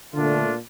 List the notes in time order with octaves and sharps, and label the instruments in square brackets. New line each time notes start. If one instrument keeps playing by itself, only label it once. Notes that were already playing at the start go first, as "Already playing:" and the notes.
[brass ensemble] A#2 A3 D4 F4 [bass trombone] D3